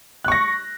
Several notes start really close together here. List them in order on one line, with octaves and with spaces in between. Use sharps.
F#6 C#6 A#6